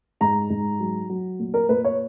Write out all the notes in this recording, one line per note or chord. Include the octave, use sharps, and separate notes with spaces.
G#2 A#5
G#2
F#3
F#3
A#2
A#4
A#2 B4
C#5